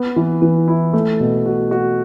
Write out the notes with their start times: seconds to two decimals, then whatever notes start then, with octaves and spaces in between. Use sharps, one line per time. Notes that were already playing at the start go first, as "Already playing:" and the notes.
Already playing: B3
0.16 E3
0.42 E3
0.68 E4
0.93 A3
1.20 B2
1.46 F#4
1.71 F#4